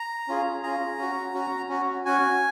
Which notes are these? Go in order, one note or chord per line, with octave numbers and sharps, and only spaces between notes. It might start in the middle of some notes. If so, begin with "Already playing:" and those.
Already playing: A#5
C#4 F4 G#4
C#4 F4 G#4 A#5
C#4 F#4
C#4 F#4
C#4 F#4
C#4 F#4 G#5